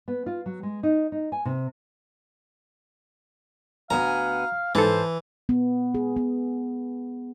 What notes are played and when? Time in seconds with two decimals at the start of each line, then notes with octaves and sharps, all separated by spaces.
0.08 B3
0.26 F4
0.46 F#3
0.63 G#3
0.83 D#4
1.12 D#4
1.32 G#5
1.45 C3
3.90 D2 B3 F5 G#5 A#5
4.75 G#2 E3 A4 C5 A5
5.49 B3
5.94 G#4
6.16 B3